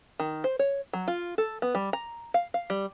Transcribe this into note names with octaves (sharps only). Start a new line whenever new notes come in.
D#3
C5
C#5
F#3
F4
A4
B3
G3
A#5
F5
F5
G3